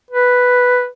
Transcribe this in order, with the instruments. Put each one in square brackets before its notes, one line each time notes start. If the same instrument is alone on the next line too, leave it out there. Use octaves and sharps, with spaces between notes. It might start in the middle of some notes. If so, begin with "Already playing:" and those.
[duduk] B4